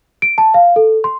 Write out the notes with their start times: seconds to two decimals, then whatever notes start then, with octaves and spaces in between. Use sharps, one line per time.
0.22 D7
0.38 A5
0.54 F5
0.76 A4
1.04 C6